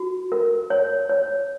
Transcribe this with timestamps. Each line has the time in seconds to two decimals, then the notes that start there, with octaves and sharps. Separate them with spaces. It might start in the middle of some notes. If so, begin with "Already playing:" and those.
Already playing: F#4
0.32 A#4
0.70 C#5
1.09 C#5